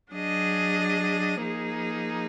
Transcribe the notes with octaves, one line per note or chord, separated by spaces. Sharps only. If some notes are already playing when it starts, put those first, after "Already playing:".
F#3 D4 G#4 D#5
F3 A#3 D#4 G#4